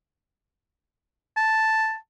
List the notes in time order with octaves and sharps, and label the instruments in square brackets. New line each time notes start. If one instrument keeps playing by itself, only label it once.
[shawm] A5